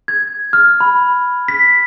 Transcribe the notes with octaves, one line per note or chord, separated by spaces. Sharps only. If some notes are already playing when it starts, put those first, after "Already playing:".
G#6
F6
B5
B6